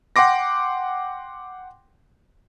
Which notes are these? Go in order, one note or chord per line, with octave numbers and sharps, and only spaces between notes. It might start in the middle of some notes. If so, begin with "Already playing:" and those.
F#5 G5 C6 D6 A#6